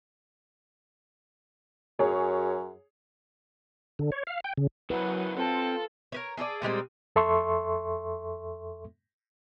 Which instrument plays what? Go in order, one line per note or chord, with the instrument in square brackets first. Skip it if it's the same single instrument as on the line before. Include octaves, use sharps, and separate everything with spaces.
[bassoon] F#2 [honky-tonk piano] G#4 C#5
[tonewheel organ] D3
C#5
F5
G5
C#3
[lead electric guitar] C#3 E4 [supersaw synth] F#3 F#5 D#7 [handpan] B4
[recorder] C4 [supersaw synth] F4 [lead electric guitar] A4 A5
[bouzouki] A#4 B4 C#5
G#4 A4 C#5 D5
A#2 G3 G#3 C4
[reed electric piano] F2 A4 E5 C6 C#6